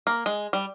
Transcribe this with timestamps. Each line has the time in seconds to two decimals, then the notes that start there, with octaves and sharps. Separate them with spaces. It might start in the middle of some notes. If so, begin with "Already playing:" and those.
0.07 A#3
0.26 G#3
0.53 G3